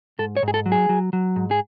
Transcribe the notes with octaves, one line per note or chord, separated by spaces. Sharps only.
G#2 A4
C#5
G#2
G#4
A4
F#3
G#4
F#3
F#3
G#2
G#4